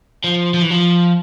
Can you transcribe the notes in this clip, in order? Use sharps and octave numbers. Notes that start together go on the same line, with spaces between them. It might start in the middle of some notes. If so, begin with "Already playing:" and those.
F3
F3
E3
F3